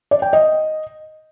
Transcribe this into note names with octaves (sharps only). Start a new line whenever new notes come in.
D5
G5
D#5